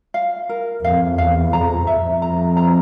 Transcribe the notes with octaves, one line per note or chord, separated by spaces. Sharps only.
F5
A#4
F2 F5
E2 F5
F2 A#5
F2 E5
A#5
A#5